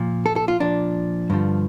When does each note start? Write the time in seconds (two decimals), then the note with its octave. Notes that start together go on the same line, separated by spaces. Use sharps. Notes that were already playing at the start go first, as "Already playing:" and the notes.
Already playing: A#2 F3
0.26 A4
0.36 A4
0.48 F4
0.60 A#2 F3 D4
1.30 G2 D3 F3